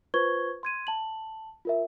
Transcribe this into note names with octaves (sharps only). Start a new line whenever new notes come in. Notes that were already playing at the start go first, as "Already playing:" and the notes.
F4 B4 C5 C#6 G#6 G7
C6 G#6 D#7
A5 F#7
F4 A#4 E5